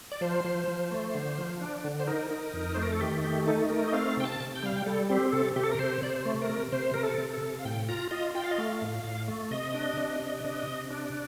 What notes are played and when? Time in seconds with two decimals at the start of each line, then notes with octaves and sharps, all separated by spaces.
0.12 D5
0.21 F3 C5
0.44 F3
0.68 F3
0.91 A3
1.15 D3
1.38 F3
1.61 D4
1.84 D3
2.00 C5
2.07 D#4 A#4
2.31 D#4
2.53 F2
2.74 A3 C5
2.83 A#4
2.92 A4
3.00 D#3 G4
3.24 A3 G4
3.47 D#4 A4
3.70 A3 A#4
3.88 D#5
3.93 C4 F5
4.17 C3 G5
4.24 A5
4.40 C3
4.56 G5
4.63 G3 F5
4.76 G5
4.86 G3 A4
5.09 C4 G4
5.32 C3 A4
5.56 C3 G4
5.63 A4
5.71 A#4
5.79 C3 C5
6.02 C3 D5
6.10 C5
6.25 A3
6.42 A#4
6.49 C3
6.72 C3 C5
6.94 C3 A#4
7.03 A4
7.18 C3
7.33 A4
7.41 C3
7.59 F5
7.65 A2 G5
7.89 F4 A#5
8.11 F4 D#5
8.35 F4 G5
8.44 F5
8.51 D#5
8.58 A3 F5
8.82 A2
9.04 A2
9.28 A3
9.50 C3 D#5
9.74 D4
9.97 C3
10.20 D4
10.44 C3
10.67 C3
10.91 D4